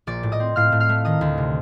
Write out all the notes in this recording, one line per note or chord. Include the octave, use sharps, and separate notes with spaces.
A#1 D5 D6
A2
D#5 D#6
C4
A2 F5 F6
A2
F5 F6
A3
D#3 D#5 D#6
D2
C3